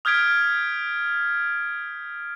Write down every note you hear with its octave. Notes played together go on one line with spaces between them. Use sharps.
D#6 F6 G6 G#6 B6 D7